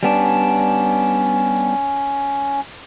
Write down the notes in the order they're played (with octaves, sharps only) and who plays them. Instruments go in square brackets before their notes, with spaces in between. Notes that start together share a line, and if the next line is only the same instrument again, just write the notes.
[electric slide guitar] G3 B3 D4 [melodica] C#4